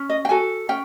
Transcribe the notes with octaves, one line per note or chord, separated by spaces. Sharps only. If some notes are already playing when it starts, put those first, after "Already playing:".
Already playing: C#4
D#5
G5
F#4 A4 G#5
C#4 G5